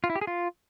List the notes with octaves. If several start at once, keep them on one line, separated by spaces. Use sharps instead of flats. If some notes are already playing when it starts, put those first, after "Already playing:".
F4
E4
G4
G#4
F4